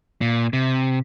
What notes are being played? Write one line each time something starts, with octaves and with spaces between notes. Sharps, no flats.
A#2
C3